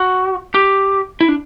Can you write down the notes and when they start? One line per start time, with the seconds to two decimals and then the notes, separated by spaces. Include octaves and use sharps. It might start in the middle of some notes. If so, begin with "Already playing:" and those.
Already playing: F#4
0.54 G4
1.21 E4
1.28 D4